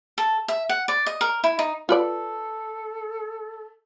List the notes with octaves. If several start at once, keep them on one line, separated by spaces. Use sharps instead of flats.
A4
E5
F#5
D5
D#5
A#4
E4
D#4
F4 A4 B4 D5